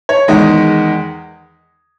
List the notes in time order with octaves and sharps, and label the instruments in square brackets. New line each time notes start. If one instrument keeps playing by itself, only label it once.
[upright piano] C#5
E2 D#3 G#3 D#5